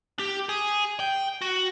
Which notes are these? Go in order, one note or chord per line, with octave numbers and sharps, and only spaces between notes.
G4
G#4
G5
F#4